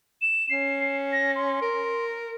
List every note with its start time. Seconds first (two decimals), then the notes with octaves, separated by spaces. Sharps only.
0.22 E7
0.50 C#4 C7
1.12 A#6
1.36 C6
1.62 A#4